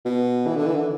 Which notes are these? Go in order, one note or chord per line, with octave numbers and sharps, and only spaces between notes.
B2
E3
D3
E3
D3